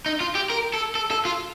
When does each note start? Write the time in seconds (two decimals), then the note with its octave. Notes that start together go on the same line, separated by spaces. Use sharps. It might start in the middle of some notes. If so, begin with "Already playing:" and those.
0.06 D#4
0.20 F4
0.35 G4
0.50 A#4
0.74 A4
0.95 A4
1.11 A4
1.25 F4